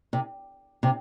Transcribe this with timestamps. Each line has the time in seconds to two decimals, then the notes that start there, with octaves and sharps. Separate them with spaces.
0.13 C3
0.83 C3